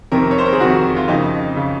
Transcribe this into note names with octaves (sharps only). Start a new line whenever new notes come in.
F2 C3 D#3 A#4
C#5
C5
A#4
G#4
F2 C3 D#3 F#4
F4
F2 C#3 D#4
C#3